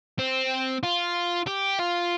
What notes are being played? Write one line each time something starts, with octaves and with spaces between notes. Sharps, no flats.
C4
F4
G4
F4